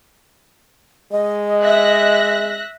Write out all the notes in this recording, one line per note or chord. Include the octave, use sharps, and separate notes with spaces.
G#3 D#5
E5 F#6 A#6